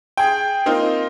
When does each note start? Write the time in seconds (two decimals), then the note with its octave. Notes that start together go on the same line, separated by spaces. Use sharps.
0.17 G#4 G5
0.66 A#3 C4 D#4 F4